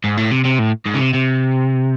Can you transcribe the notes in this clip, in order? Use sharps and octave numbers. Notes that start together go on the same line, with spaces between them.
G#2
A2
C3
C3
A2
G#2
C#3
C3
C3